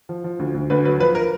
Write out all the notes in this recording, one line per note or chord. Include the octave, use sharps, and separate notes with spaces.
F3
F3
D2
D2
D2 B4
F#3 B4
F3 B4
A#4